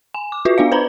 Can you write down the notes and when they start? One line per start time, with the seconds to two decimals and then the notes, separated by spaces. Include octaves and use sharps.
0.14 G#5
0.32 D6
0.45 F4 F#4 B4 E5
0.58 B3 D4 D5 F5
0.72 B4 C5 A#5 B5